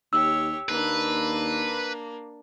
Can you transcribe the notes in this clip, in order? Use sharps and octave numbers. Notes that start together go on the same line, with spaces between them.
D#2 G4 C#5 E6
D#2 A#3 D4 B4